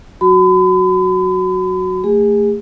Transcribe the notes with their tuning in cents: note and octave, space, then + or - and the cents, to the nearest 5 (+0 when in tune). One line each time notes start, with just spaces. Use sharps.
F#3 +0 F#4 +0 B5 +40
A3 +20 G#4 -35 G#5 +0